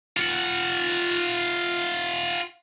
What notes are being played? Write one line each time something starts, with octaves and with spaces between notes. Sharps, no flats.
F4 F#5